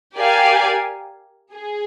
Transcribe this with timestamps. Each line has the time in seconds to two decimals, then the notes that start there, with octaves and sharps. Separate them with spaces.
0.17 G4 A#4 D5 F5 G#5
1.54 G#4